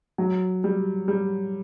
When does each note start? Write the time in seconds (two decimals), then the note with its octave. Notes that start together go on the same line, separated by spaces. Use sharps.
0.18 F#3
0.64 G3
1.08 G3